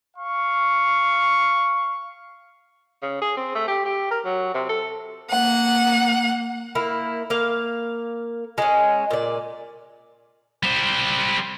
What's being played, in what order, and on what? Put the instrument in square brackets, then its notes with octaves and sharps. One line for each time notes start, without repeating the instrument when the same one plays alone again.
[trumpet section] F5 C#6
[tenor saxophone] C#3
G#4
C4
A3
G4
G4
A#4
F#3
C3
A4
[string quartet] A#3 F#5
[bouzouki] A#3 E4
A#3 F5
G#3 C#4
A#2 D5
[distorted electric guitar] G3 C5